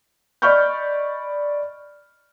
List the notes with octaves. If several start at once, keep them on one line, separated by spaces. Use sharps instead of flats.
D5 D#5 B5 C#6 F6 G6